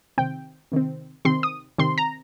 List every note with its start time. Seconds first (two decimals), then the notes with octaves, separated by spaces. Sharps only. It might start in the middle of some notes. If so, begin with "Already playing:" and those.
0.18 C3 D#3 C4 G5
0.72 C3 D#3 C4
1.25 C3 D#3 C4 C6
1.43 D#6
1.78 C3 D#3 C4 C6
1.98 A#5